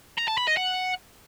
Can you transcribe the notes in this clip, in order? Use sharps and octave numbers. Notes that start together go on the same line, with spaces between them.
A#5
A5
B5
D#5
F#5